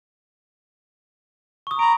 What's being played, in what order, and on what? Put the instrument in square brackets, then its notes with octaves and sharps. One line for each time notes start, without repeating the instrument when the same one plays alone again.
[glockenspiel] C#6 D#6
[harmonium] A#5 [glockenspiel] B5 D7